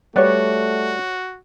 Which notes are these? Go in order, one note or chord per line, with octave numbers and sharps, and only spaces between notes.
G3 A3 F#4 B4 C#5 D5 F#5